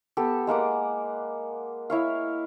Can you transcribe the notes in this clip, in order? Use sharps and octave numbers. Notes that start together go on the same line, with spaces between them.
B3 G4 A4
G#3 A#3 F#5 D6
E4 C#5 F5